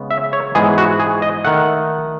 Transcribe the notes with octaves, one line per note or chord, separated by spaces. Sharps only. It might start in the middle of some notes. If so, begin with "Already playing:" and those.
Already playing: C#3 G#3 B3
E5
C#5
G#2 E3 G#3 B3 G#4
F#4
G#4
D#5
D#3 A3 F#5